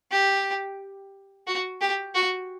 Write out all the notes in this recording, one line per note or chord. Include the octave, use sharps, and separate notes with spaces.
G4
F#4
G4
F#4